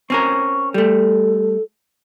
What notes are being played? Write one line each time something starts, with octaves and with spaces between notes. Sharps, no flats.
C4 C#4 A#4 C#6
G3 A3 A4